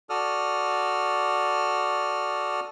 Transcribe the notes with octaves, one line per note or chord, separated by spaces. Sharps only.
F#4 A4 D5 D#6 F6